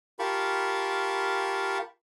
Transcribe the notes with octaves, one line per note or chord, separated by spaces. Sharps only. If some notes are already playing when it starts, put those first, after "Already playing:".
F4 G4 A#4 A5 B5 C#6